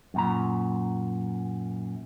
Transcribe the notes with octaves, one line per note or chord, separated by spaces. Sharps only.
F#2 A#2 A#5